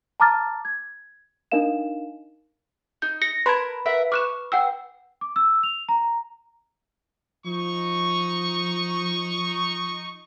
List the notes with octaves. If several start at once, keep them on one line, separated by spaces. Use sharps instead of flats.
A5 A#5 D6 F6 A6
G#6
D4 D#4 A#4 D#5 F5 E7
D#4 G6
A#6 C#7
A#4 B4 A5 B5 C6 G#6
A#4 E5 F#5
C#6 D6 F6 F#6 E7
F#5 G5 E6
D6
E6
F7
A#5
F3 D#4 C#6